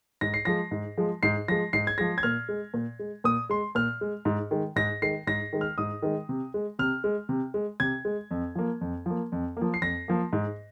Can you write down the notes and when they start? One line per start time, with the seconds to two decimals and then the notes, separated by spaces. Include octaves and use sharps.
0.21 G#2 A#6
0.34 C7
0.45 F3 G#3 A#6
0.71 G#2
0.97 F3 G#3
1.23 G#2 C7
1.48 F3 G#3 A#6
1.73 G#2 C7
1.87 G#6
1.98 F3 G#3 A#6
2.18 G#6
2.23 A#2 F6
2.49 G#3
2.74 A#2
2.99 G#3
3.24 A#2 D#6
3.49 G#3 C6
3.75 A#2 F6
4.01 G#3
4.25 G#2
4.51 D#3 G#3
4.76 G#2 A#6
5.02 D#3 G#3 C7
5.27 G#2 A#6
5.53 D#3 G#3
5.61 F6
5.78 G#2 D#6
6.02 D#3 G#3
6.29 C3
6.54 G#3
6.79 C3 F6
7.04 G#3
7.29 C3
7.54 G#3
7.80 C3 G#6
8.05 G#3
8.31 F2
8.55 F3 A#3
8.81 F2
9.06 F3 A#3
9.32 F2
9.57 F3 A#3
9.74 C7
9.82 F2 A#6
10.08 F3 A#3
10.33 G#2